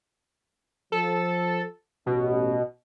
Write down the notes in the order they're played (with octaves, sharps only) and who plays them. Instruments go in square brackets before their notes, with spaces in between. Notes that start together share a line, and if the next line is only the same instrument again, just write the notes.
[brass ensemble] F3 [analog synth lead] A4
[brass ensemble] A1 [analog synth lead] B2